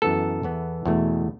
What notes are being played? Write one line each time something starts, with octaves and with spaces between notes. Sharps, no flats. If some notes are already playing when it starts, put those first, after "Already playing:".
F#2 E3 B3 A4
E2 E3 B3
E2 B2 A3